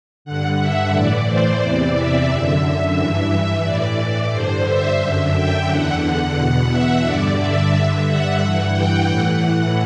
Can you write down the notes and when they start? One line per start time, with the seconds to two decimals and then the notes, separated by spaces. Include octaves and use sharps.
0.25 G2 D3 F#5
0.58 E5
0.92 A2 E3 D5
1.27 C5
1.60 E2 C3 E3 D5
1.94 E5
2.28 F#2 D3 E5
2.96 G2 E3
3.31 E5
3.64 A2 E3 D5
3.98 D5
4.32 G2 D3 C5
4.66 E5
4.99 F#2 D3 E5
5.34 G5
5.67 E2 D3 F#5
6.35 E2 B2 F#5
6.69 E5
7.03 G2 D3 D5
7.38 E5
7.71 G2 D3
8.06 F#5
8.40 G2 E3 F#5
8.74 G5
9.07 A2 E3 F#5
9.41 F#5